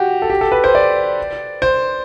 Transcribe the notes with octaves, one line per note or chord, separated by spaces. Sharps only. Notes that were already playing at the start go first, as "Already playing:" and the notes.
Already playing: F#4 G4
A4
G4
A4
B4
C5
D5
C5